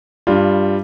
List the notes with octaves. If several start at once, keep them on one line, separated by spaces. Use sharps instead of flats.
G2 G3 F4